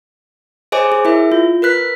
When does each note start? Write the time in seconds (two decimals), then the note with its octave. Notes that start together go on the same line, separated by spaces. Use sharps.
0.72 G#4 C5 C#5 D#5 G#5 D6
0.92 G#4
1.05 E4 A#4 E5
1.32 F4
1.62 A#4 B4 F#6 B6